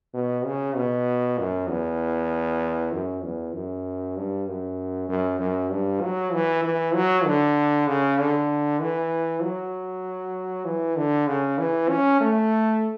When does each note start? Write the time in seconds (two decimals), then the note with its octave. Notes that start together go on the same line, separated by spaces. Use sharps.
0.14 B2
0.45 C#3
0.76 B2
1.38 F#2
1.69 E2
2.92 F#2
3.24 E2
3.54 F#2
4.16 G2
4.47 F#2
5.09 F#2
5.40 F#2
5.71 G2
6.02 F#3
6.33 E3
6.64 E3
6.95 F#3
7.26 D3
7.88 C#3
8.18 D3
8.80 E3
9.42 F#3
10.65 E3
10.97 D3
11.28 C#3
11.58 E3
11.89 C#4
12.20 A3